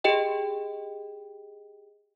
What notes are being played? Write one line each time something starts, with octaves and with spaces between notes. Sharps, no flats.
G4 G#4 D#5 G5